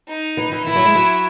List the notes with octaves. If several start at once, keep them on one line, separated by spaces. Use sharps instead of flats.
D#4
E3
E3
E3 E4
F#3
G#3
F#3